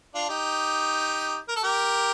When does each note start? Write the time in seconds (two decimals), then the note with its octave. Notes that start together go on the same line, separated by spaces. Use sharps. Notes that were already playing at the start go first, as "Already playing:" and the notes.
0.15 D4 F4
0.29 D#4 G4
1.48 A#4
1.56 A4
1.64 G4 A#4